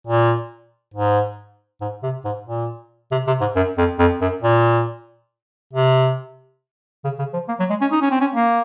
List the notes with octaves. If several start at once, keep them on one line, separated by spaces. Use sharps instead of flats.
A#2
G#2
G#2
C3
G#2
A#2
C3
C3
G#2
F#2
F2
F2
F#2
A#2
C3
C#3
C#3
F3
A#3
F#3
G#3
C#4
D#4
C#4
C4
C#4
A#3